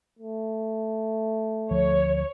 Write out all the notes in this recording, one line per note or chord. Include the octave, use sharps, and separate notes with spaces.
A3
D2 F3 C#5